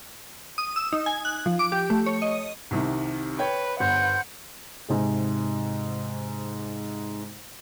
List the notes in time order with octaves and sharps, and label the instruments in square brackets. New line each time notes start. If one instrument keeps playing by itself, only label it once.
[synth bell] D#6
E6
D#4
G#5
F#6
F3
D6
G4
A3
C#5
D#5
[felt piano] C2 C3 D#3
[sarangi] B4 [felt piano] C#5 G5
[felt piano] G1 [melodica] C5 [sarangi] F#5
[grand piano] G#2 C3 G#4